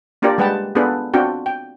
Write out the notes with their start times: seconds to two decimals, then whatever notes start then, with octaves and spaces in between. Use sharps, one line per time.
0.22 A#3 D4 F4 G4 A#4 D5
0.38 G3 G#3 B4 F#5 G5 A5
0.75 B3 D4 F4 G#4 A4 B4
1.14 C4 D4 F4 F#4 G5
1.46 G5